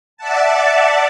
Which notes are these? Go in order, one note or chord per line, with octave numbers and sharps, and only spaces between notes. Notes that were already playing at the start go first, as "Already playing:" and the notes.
D5 E5 F#5 A5